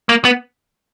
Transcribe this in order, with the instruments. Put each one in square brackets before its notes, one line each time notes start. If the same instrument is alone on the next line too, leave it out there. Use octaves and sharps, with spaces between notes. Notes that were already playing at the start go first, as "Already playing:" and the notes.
[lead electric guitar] A#3
B3